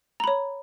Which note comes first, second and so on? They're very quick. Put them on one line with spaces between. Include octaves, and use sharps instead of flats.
A#5 B5 C#5